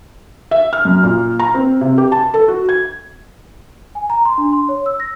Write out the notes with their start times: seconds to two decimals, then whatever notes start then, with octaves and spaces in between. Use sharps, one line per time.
0.51 E5
0.73 F6
0.85 F#2
1.03 A#2
1.40 A#5
1.55 C4
1.81 C3
1.98 G4
2.12 A5
2.34 A4
2.48 F#4
2.69 G#6
3.95 G#5
4.10 A#5
4.25 C6
4.38 D4
4.53 C6
4.69 C#5
4.86 E6
5.00 A#6